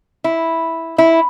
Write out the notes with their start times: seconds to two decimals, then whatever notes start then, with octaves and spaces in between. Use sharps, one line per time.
0.24 E4
0.98 E4